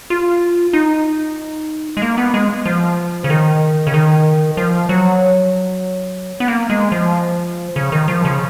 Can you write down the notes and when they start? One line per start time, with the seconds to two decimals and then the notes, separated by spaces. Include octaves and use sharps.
0.10 F4
0.73 D#4
1.97 G#3
2.02 A#3
2.18 B3
2.34 G#3
2.66 F3
3.24 C#3
3.30 D#3
3.87 C#3
3.94 D#3
4.57 F3
4.89 F#3
6.40 B3
6.48 A#3
6.70 G#3
6.92 F3
7.76 C#3
7.92 D#3
8.08 F3
8.25 C#3